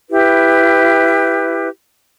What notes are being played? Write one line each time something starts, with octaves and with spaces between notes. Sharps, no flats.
E4 G4 B4